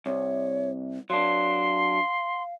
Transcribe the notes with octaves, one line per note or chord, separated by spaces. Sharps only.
C2 C#5
F#3 D4 F5 C6